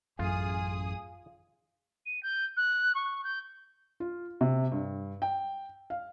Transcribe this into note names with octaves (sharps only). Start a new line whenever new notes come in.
A1 F#2 A3 F4 G#4 D#6
D#7
G6
F#6
C#6
G6
F4
C3
G2
G5
F5